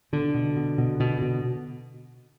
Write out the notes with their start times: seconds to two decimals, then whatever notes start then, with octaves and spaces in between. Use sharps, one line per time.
0.13 B2 D3
0.35 B2
0.57 B2
0.78 B2
1.00 B2
1.22 B2